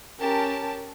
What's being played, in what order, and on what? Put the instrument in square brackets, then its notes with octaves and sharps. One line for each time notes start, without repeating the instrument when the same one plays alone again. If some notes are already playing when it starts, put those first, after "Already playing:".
[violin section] C#4 G4 A#4 A5